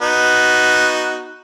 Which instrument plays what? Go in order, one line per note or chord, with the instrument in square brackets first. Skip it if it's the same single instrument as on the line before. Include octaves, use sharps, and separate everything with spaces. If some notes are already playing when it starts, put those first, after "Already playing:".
[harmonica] B3 D#4 F#4